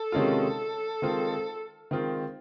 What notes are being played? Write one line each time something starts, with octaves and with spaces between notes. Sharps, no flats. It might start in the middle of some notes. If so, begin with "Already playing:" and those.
Already playing: A4
C3 D#3 G#3 C#4 F4
D#3 G#3 C4 F4
D#3 G#3 C4 F4